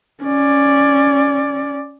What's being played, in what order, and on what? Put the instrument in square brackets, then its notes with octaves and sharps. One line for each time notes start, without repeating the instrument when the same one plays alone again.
[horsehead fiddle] C#4 D5